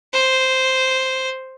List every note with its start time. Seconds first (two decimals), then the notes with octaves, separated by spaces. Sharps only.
0.13 C5